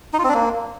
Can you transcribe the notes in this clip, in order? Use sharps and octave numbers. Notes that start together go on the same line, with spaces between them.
D#4
F4
C4
D4
A#3